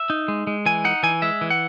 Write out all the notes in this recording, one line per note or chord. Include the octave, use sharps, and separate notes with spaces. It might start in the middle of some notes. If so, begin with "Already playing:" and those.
Already playing: E5
D#4
G#3
G#3
E3 G#5
D#4 F#5
E3 G#5
G#3 E5
E3
F#5